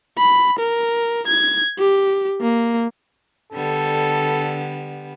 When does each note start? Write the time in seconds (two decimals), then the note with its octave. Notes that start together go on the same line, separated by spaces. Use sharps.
0.18 B5
0.60 A#4
1.28 G#6
1.79 G4
2.41 A#3
3.52 D3 G3 B3 A4